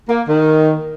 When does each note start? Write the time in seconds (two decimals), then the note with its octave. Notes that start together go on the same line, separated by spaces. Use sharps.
0.09 A#3
0.28 D#3